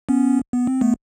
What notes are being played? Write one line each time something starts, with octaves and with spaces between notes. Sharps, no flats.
B3 C#4
B3
C4
A3 B3